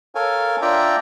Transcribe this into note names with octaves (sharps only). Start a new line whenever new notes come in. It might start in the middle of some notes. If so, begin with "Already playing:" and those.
A4 A#4 C#5 F5 G#5
D4 F4 D5 E5 G5 A#5